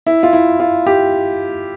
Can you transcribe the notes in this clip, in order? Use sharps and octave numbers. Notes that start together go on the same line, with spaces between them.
E4
F4
E4
F4
G4